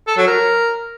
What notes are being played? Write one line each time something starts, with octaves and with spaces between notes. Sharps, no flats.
A4
F#3
A#4